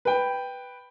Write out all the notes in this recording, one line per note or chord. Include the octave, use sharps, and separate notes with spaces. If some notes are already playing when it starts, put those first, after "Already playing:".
B4 G5